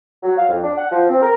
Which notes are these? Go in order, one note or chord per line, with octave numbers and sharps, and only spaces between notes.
F#3
F5
F2
D4
F#5
F3
C4
A#4